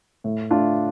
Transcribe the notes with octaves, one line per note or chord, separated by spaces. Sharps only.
A2
A3 D4 F4